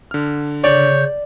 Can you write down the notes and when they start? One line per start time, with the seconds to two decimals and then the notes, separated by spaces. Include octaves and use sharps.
0.11 D3 F6
0.64 C#3 C#5 D5 G6